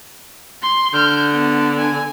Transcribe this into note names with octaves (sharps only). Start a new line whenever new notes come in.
C6
D3 F6 G6
B3
G#5